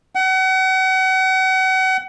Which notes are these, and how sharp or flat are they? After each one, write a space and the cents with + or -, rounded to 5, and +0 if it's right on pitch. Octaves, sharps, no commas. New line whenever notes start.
F#5 +35